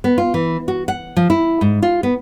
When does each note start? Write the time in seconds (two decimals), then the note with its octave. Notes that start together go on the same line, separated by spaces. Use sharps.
0.04 B3
0.18 F4
0.34 E3
0.68 F#4
0.88 F#5
1.17 F3
1.30 E4
1.61 G#2
1.83 F4
2.03 B3